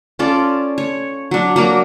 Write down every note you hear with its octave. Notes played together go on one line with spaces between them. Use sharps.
C#4 F4 A4 D5
C#5
F#3 D4
F#3 A#3 A#5 D6